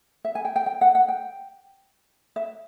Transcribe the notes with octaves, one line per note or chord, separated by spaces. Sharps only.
E5
G#5
G5
G5
G5
F#5
F#5
G5
E5